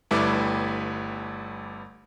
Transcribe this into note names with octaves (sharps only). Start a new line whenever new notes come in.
G1 G3 A3 E4 B4 D6